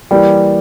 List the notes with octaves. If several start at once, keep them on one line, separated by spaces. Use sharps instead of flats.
E3 G3 A#3